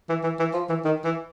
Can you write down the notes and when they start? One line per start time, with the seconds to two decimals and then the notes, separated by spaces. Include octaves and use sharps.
0.09 E3
0.24 E3
0.39 E3
0.53 F3
0.69 E3
0.85 D#3
1.04 E3